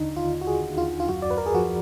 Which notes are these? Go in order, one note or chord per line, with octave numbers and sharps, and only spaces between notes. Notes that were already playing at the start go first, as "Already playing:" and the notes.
Already playing: D#2 D3 D4 D#4
D#2 F4
F#4
G#4
D#2
F4
F4
F#2 F#4
D5
B4
A#4
G#4
F3 F#4